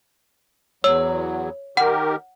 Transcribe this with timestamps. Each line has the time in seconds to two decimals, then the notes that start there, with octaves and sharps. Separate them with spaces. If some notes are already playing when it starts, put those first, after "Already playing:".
0.84 E2 F#3 C#5 E6
1.77 D#3 G4 A#4 F#5